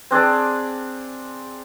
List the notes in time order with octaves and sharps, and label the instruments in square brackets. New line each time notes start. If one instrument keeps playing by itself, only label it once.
[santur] C4 D4 G#4 D5